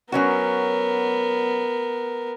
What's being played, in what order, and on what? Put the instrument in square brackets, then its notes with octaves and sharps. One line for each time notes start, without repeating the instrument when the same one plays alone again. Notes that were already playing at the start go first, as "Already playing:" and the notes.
[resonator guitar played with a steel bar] F#3 C#4 F#4 [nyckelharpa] B3 A#4